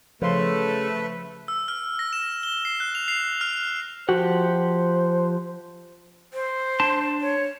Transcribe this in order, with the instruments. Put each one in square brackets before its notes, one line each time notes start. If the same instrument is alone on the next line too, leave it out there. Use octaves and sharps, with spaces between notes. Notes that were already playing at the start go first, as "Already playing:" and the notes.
[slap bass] C#3 [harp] F3 C6 [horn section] A3 [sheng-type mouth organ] B4
[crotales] E6
F6
A#6
E7
G7
C7
F#6
F7
C7
F6
[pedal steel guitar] F3 G4 F#5 [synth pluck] F#4 [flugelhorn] C5
[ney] C5
[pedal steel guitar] D4 A5 C6
[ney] C#5